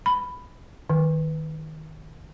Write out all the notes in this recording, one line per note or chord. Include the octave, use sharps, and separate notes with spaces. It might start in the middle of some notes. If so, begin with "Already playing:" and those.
B5
D#3